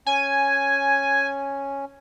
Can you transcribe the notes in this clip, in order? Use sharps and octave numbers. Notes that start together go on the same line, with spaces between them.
C#4 G#5